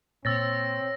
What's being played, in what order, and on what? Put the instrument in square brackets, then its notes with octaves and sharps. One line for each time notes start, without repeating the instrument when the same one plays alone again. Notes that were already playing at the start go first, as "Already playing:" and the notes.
[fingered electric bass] A#2 [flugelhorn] C4 [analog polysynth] C#5 [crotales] E6 A6 A#6